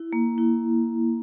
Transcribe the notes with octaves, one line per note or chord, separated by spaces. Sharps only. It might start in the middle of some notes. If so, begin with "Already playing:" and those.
Already playing: E4
A#3
E4